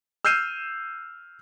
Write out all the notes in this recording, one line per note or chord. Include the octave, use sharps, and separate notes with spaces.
E6 F6 G6 C7 D#7 E7